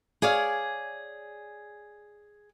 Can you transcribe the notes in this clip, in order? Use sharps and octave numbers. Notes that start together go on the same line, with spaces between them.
G#4 C#5 D5 F5